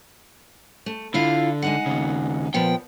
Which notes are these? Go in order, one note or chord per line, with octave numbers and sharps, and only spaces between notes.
A3
D3 E4 F4 F5
G#3 D#4 F#5
D#2 C#3
A#2 F3 B3 G5